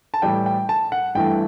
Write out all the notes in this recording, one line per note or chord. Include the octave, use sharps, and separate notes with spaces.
A5
A2 E3 G3 G5
G5
A5
F#5
G2 E3 A3 G5